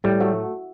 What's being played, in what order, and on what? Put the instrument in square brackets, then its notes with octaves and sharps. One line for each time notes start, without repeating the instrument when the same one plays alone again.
[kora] A2 [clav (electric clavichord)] G3
[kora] F#3 A3